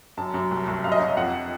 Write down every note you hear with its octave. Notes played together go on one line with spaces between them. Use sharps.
F#2 A5
F#2
C2
C2
F#2 F5
D#5
F#2 C#5
D#5
F2 F#5